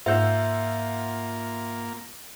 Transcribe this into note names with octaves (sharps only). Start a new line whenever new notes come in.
G#2 A#3 F4 E5 F#5 E6 G6